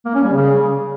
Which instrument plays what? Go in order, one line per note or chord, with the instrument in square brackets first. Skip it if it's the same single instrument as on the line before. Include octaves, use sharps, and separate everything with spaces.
[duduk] A#3
C#4
G3
C#3